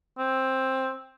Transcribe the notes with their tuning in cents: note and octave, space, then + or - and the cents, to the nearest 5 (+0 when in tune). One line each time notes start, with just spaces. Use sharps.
C4 +10